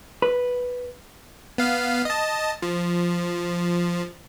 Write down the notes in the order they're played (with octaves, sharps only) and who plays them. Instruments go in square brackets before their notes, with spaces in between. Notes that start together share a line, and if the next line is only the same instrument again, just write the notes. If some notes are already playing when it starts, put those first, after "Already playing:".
[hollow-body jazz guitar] B4
[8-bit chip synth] B3 F5
D#5 A5
F3